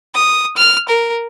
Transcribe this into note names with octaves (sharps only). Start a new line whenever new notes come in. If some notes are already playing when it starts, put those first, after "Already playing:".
D#6
F6
A#4